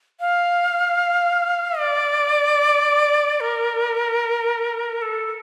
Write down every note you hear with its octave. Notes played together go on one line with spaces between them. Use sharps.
F5
D5
A#4
A4